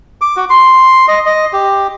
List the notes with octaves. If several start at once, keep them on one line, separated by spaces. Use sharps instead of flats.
D6
F#4
C6
D#5
D#5
G4